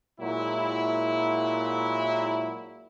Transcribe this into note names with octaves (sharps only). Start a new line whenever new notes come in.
A#2 F#3 G#3 E4